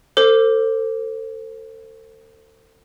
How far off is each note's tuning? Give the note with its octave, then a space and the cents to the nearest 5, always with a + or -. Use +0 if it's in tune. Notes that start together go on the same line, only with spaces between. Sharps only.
A4 +35 C5 +0 D6 +0